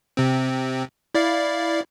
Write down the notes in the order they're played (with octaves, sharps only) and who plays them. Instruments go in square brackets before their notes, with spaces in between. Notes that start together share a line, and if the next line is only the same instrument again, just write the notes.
[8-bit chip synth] C3 C4
E4 D5 F5